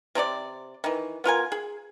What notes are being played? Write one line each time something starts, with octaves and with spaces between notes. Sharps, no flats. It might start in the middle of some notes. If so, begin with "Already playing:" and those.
C3 C4 D4 D5
D#3 E3
B3 F4 A#4 G#5
G#4